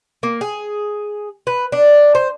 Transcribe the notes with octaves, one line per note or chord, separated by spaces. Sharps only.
A#3
G#4
B4
D4
C5